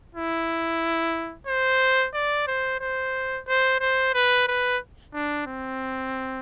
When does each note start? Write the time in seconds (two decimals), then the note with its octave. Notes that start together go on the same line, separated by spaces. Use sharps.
0.15 E4
1.47 C5
2.14 D5
2.47 C5
2.80 C5
3.48 C5
3.80 C5
4.14 B4
4.48 B4
5.14 D4
5.47 C4